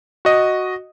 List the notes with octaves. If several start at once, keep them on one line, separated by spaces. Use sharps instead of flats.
F#4 D#5